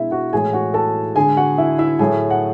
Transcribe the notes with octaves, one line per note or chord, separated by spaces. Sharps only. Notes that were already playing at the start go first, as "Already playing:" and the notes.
Already playing: B2 G#3 D4 E4 E5
F#4 F#5
A2 E3 G#3 G#4 G#5
F#4 F#5
A4 A5
D3 G#3 G#4 G#5
F#4 F#5
E4 E5
E4 E5
A2 F#3 A3 G#4 G#5
F#5